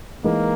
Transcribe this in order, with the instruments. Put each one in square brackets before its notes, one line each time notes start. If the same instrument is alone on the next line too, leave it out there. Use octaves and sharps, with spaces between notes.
[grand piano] E3 G#3 D#4 A#4 [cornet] A#3